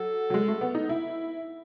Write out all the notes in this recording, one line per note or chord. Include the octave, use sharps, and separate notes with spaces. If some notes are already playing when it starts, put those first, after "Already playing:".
Already playing: F#3 A4
F#3
G#3
A3
B3
D#4
E4